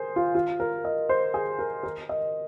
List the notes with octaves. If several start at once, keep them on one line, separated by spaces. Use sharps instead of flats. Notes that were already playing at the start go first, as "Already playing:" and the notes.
Already playing: G#4 A#4 C5
F4
F4
A#4
D#5
C5
G#4
A#4
A#4
D#5